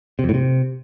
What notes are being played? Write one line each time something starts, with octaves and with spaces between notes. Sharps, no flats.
C3
F2
A2
C3